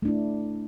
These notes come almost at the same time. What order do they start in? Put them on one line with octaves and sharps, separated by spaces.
A3 D4 E4